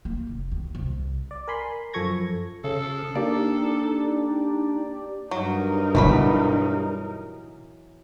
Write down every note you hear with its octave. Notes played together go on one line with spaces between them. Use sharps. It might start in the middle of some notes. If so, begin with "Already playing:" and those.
A#3
F1
D#2
C2
D5
A#4 G#5 B5 C6
F#2 F3 A4 C#6 G#6 A#6
C#3 A4
A#3 D4 D#4 G4 D5
G2 F#3 D#4 A#4
B2 E3 F#3 E4 B5